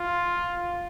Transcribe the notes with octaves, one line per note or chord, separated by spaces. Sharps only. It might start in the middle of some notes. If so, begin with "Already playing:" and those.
Already playing: F4